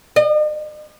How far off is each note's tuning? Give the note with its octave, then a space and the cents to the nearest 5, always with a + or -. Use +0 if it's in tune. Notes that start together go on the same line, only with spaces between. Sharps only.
D#5 -45